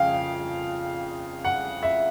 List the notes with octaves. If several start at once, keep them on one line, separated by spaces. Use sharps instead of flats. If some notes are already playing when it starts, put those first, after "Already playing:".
Already playing: F2 C#3 F5 G5
F#5
E5